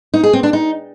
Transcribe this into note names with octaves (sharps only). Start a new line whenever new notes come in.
D#4
G#4
C4
D4
D#4